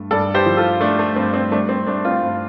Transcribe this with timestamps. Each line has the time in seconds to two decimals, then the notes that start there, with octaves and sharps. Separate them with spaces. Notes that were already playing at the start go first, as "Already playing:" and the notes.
Already playing: G2 A3
0.11 G2 A4 D5
0.34 G4 C5
0.46 F3
0.57 F4 A4
0.81 A3 D4
0.99 A3
1.16 G2 C4
1.34 C4
1.51 G3 A3 D4
1.69 C4
1.86 G3 A3 D4
2.05 C4 F4
2.22 G2